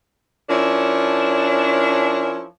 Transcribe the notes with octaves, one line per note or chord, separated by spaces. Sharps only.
F3 C#4 D4 E4 A#4 C#5